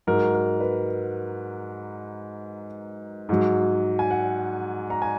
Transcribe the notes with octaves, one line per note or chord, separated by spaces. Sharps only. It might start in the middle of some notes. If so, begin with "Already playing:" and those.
G#2 F#3 A#4
A#4
B4
G#2 F#3
G#5
F#5
A#5
G#5